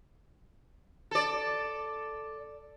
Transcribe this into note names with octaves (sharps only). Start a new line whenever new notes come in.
A4 D5